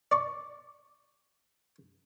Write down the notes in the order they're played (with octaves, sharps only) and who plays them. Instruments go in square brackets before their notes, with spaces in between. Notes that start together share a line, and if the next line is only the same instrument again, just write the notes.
[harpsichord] D5 C#6